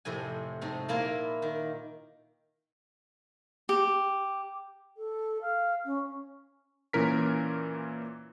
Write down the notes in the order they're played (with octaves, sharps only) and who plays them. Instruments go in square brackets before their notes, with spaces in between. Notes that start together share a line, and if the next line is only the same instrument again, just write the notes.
[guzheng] F2 A2 C3 G#5
G#2 C3 A3
A#2 A#3 E4 F4 A#4
D#3
[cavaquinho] G4
[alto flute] A4
F5
C#4
[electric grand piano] A#2 E3 C#4 A#4 B6